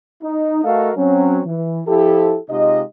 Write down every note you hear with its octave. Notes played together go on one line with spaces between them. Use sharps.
D#4
A3 F#4 A4 A#4 D#5 F5
F#3 C4 C#4
E3
F3 E4 G4 A4
C3 G#3 D#4 F4 G4 D#5